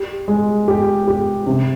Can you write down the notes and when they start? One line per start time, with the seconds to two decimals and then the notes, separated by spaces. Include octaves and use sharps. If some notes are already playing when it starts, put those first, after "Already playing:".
Already playing: G4
0.28 G#3
0.68 G4
1.07 G4
1.47 C3